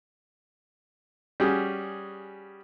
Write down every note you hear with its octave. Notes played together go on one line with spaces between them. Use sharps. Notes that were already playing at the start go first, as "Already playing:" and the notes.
G3 C#4 F#4 G#4